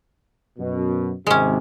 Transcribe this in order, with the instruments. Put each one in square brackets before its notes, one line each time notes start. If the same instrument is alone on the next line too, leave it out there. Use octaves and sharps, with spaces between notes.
[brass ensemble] F#2 B2
[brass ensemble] G#1 C3 [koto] G#3 C#4